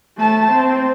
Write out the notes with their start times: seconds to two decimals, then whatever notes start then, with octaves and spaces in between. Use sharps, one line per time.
0.18 A3 A5
0.51 C4